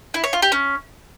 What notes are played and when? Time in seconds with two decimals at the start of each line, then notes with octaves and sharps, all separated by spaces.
0.14 E4
0.24 C#5
0.33 F4
0.42 G4
0.52 C#4